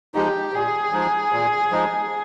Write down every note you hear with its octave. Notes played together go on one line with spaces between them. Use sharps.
F3 G#3 D#4 G4
A#2 G#4
F3 G#3 D#4
A#2
F3 G#3 D#4